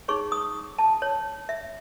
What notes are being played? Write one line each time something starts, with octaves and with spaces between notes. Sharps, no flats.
D#4 G#4 C#5 C#6
D#6
A5
C#5
E5